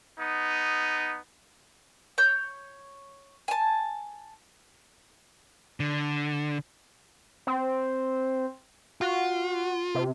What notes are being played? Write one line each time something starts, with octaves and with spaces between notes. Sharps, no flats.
B3 D#4
C#5 G6
G#5 A5
D3
C4
F4 F#4
C3